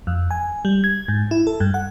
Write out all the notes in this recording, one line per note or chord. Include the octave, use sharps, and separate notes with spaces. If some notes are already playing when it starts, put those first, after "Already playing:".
F2
G#5
G3
G#6
G#2
E4
A4
G2
F#5